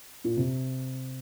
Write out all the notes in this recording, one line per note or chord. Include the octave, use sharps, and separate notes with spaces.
A#2
C3